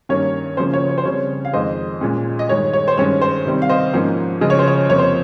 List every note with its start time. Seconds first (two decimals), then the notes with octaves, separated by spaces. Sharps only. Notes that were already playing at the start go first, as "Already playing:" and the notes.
0.09 G2 D#3 A#3 C#4 C#5
0.57 C#3 F3 A#3 C#4 C5
0.74 C#5
0.89 C#5
0.98 C5
1.05 C#3 G3 C4 C#5
1.45 F5
1.53 F2 D#3 G#3 C5 D#5
2.01 A#2 G#3 C#4
2.39 D#5
2.49 G2 D#3 G#3 C#5
2.73 C#5
2.88 C5
2.98 G2 D#3 G#3 C#4 C#5
3.21 C5
3.45 C3 D#3 G3 C4
3.62 F5
3.69 C5 D#5
3.93 G#2 F3 A#3 C#4
4.41 C#3 F3 G#3 D#5
4.50 C#5
4.59 C5
4.67 C#5
4.89 F2 C3 F3 A#3 C#5
4.98 C5